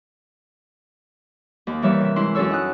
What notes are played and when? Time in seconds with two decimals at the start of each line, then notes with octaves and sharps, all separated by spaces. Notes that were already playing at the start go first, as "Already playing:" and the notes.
1.67 D#2 B5
1.82 E3 G3 G4 A#4 C#5 E5
2.01 C3 E5
2.16 G#2 E4 C6
2.35 F#2 C#4 G#4 A4 C#5 E6
2.50 D#4 F#5 D#6 F#6